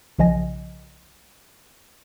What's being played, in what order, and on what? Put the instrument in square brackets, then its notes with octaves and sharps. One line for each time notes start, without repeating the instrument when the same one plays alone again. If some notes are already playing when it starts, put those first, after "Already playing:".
[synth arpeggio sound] B1 C#3 F3 D#5 G#5 A#6